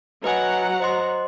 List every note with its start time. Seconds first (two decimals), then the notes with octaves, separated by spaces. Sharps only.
0.24 F#3 B4 D#5 F#5 G#5 A#5
0.80 C5 D#5 C6